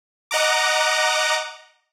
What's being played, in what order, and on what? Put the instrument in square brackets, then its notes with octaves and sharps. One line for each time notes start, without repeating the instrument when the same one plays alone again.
[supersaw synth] D#5 F#5 A#5 D6